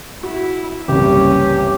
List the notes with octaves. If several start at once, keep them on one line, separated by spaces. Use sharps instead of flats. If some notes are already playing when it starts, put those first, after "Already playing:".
E4 F#4
F#1 C2 E3 G3 C#4 G4